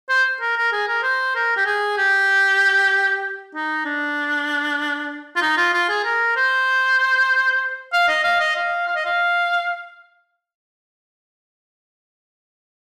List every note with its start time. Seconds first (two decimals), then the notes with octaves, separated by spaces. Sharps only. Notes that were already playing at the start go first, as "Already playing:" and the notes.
0.09 C5
0.41 A#4
0.57 A#4
0.72 G#4
0.88 A#4
1.03 C5
1.35 A#4
1.56 G4
1.65 G#4
1.97 G4
3.55 D#4
3.85 D4
5.36 F4
5.42 D#4
5.57 F4
5.73 F4
5.89 G#4
6.04 A#4
6.36 C5
7.93 F5
8.08 D#5
8.23 F5
8.40 D#5
8.55 F5
8.87 F5
8.95 D#5
9.05 F5